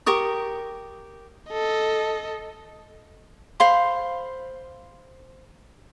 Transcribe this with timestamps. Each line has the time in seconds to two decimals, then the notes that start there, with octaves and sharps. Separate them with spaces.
0.06 G4 A#4 C#6 D#6
1.51 A4 D#5
3.60 C5 F5 B5 C6